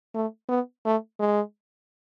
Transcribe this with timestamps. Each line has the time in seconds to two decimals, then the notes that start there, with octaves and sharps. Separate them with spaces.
0.15 A3
0.49 B3
0.85 A3
1.19 G#3